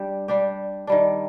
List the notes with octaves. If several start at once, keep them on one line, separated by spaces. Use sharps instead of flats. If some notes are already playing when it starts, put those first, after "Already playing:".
Already playing: G3 D4 G4
G3 D4 G4
D#3 G3 D4